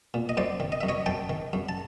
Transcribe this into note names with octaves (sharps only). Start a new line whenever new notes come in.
A#2
D#5
F#2 C5 D5
D#3
D#5
F#2 E5
C#5 D#5
F#2 G5 A5
D#3
F#2
A5